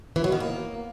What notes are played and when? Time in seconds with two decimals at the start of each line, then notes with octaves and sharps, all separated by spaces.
0.16 E3
0.24 F#3
0.32 D#3
0.40 A#3